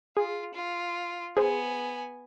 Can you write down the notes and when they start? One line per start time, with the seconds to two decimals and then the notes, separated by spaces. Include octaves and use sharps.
0.17 F4 G#4
0.54 F4
1.37 B3 G#4 C5 G#5